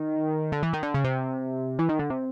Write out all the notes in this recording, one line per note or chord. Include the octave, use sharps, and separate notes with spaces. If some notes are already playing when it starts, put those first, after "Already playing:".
Already playing: D#3
D3
E3
D#3
D3
C#3
C3
E3
D#3
D3
C3